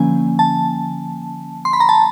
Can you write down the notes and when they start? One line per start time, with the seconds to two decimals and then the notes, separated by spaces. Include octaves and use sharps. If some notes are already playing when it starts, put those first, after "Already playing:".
Already playing: D3 F3 A#3 C#4 G#5
0.39 A5
1.65 C6
1.73 B5
1.80 A#5
1.89 A5